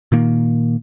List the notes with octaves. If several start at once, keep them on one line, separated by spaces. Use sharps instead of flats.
A#2 D#3 A#3